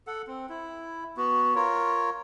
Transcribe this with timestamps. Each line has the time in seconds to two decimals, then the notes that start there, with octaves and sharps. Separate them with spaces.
0.07 A4 F#5
0.27 C4
0.49 E4
1.17 B3 F#4
1.55 F4 A#4 C#5